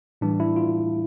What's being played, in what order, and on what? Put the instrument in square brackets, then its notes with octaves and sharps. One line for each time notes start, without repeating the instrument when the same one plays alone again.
[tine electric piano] A2 E3 G3 D4
E4
F4